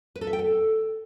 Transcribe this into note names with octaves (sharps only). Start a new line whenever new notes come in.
B4
A4
E5
G5
A4